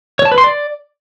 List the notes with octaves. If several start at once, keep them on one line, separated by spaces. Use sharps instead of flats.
C#5
A5
B4
C6
D5